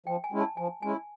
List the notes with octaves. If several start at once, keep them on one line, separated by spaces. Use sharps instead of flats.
F3 G5
G#5
G#3 C#4 E4
A5
F3 G#5
G#3 C#4 E4 G#5